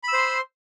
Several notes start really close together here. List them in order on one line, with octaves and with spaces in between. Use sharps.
B5 E6 C5 C6